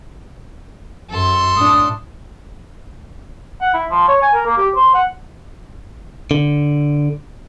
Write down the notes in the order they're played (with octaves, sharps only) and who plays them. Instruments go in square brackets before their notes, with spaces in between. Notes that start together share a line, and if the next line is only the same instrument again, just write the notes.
[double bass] F#2 [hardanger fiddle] A4 C6
[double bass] A2 D4 [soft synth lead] D#6
[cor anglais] F#5
E4
F3
C#5
G#5
A#4
A#3
G4
C5
F#5
[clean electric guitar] D3